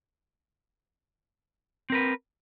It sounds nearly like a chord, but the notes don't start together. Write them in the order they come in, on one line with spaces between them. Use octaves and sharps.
C4 A#4 B4